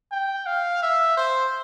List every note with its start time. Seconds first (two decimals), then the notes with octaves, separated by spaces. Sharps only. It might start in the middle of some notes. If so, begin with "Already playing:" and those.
0.12 G5
0.46 F5
0.82 E5
1.17 C5